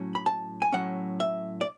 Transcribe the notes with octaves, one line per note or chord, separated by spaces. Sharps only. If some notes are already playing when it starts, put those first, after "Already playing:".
Already playing: A2 F#3 C#4
B5
A5
G#5
A2 F#3 C#4 F#5
E5
D5